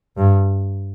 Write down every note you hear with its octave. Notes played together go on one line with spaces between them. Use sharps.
G2